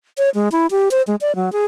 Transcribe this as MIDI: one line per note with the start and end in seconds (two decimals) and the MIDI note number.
0.18 0.30 73
0.35 0.48 56
0.52 0.67 64
0.71 0.89 67
0.91 1.02 72
1.07 1.16 56
1.21 1.35 74
1.36 1.52 54
1.52 1.66 68